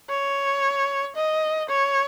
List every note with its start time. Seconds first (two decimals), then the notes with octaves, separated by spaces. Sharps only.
0.10 C#5
1.15 D#5
1.69 C#5